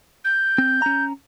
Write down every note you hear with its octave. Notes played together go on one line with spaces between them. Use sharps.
G6
C4
C#4 A#5